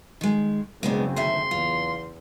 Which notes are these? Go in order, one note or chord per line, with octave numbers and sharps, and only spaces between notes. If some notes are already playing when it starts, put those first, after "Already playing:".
D#3 G#3
F#1 C#3 G#3 B3 C4 D4
D2 D#3 E5 C6
E2 F4